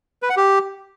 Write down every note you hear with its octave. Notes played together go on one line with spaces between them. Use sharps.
B4
F#5
G4